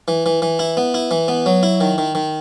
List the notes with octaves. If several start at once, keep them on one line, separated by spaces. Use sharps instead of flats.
E3
E3
E3
E4
B3
E4
E3
B3
F#3
E4
D#3
D#3
D#3